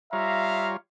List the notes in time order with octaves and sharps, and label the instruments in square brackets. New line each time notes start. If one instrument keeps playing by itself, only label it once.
[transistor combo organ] G3 F4 C#5 [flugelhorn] E5 [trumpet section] F5 A#5